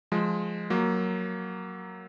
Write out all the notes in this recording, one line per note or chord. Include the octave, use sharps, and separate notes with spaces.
F3 G#3
F#3 A#3